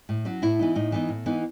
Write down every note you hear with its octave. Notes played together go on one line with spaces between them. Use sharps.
A2
F#3 C#4
A2 E4
E3 B3 D#4
A2 D#4
E3 B3 D#4
A2
E3 B3 D#4